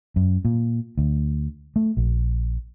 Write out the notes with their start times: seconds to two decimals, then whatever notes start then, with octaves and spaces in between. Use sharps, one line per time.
0.16 F#2
0.45 A#2
0.98 D2
1.76 A3
1.97 A#1